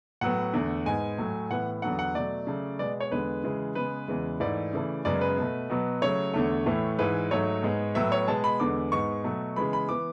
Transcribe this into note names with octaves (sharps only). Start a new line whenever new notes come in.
A2 F#3 B3 F#5
E2 D3 A3
G#2 G#3 B3 G#5
A2 F#3 A3
A2 E3 B3 F#5
E2 D3 F#3 B3 F#5
F#5
B2 F#3 A3 D5
C#3 F#3 A3
B2 G#3 B3 D5
C#5
E2 D3 G#3 B3 B4
C#3 E3 G#3
C#3 G#3 B3 B4
E2 C#3 E3 G#3
G#2 E3 A3 D5
C#3 E3 A3
F#2 C#3 G#3 B3 D5
B4
B2 A3
B2 F#3 B3
C#3 F#3 A3 C#5
E2 D3 A3
A2 E3 A3
G#2 E3 G#3 B4
G#2 F#3 A3 C#5
G#2 G#3 B3
A2 F#3 B3 E5
C#5
B2 G#3 B3 A5
B5
E2 D3 G#3 B3 D6
G#2 G#3 B3 C#6
B2 F#3 A3
C#3 E3 G#3 B3 B5
B5
E3 B3 D6